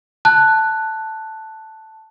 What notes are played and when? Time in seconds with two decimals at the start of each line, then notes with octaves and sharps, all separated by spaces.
0.25 A5 F#6